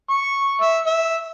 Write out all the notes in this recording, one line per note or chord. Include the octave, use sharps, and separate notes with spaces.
C#6
E5
E5